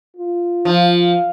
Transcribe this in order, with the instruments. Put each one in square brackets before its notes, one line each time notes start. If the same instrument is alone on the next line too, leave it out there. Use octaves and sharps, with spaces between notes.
[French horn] F4
[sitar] F3